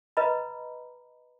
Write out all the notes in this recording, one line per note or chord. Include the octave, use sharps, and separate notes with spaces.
B4 D#5 A#5 B5